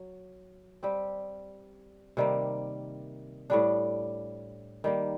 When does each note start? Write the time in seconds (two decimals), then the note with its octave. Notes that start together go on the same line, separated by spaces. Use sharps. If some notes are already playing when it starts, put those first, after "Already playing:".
Already playing: F#3
0.83 G3 C4 G4
2.17 C3 D#3 G3 A#3
3.50 A2 G3 D4
4.84 D#3 G3 A#3